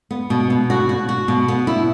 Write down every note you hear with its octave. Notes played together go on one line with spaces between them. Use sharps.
B3
B2
B2
F#4
F#4
F#4
B2
B3
E4